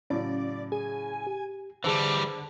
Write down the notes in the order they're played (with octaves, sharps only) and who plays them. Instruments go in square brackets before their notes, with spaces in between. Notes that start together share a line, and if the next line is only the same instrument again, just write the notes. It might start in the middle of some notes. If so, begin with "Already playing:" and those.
[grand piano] A2 C#3 F#3 [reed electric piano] C#4 [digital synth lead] D5
[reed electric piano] G#4 [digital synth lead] G#5
[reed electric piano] G4
[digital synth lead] D3 [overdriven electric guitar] E3 G3 [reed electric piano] G#4 C5 [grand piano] A5 E6